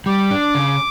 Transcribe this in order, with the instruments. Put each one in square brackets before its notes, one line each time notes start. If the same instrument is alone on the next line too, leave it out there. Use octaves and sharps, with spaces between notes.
[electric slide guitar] G3 [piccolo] D6
[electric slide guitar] D4
C#3